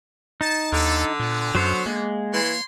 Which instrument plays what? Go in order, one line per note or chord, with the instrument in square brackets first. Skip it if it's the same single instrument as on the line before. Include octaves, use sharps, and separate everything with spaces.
[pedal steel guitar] D#4 [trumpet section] A5
[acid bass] D#2 [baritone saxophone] D3 [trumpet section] A4
[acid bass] A#2 [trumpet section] B3
[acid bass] F#2 [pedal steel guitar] F#3 C5 C#5
[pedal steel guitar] G#3 [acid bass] A#3
[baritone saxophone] E3 [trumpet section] C#5 C6